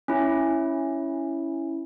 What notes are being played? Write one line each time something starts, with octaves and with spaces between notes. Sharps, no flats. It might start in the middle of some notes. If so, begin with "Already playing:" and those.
C#4 E4